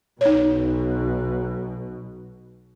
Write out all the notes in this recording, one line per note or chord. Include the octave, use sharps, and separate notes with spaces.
B1 B2 D#4 C#5